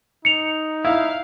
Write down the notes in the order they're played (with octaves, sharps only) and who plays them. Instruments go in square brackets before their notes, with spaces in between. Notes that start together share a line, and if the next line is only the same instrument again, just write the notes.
[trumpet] D#4 [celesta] C#7 F7
[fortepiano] E4 [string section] F5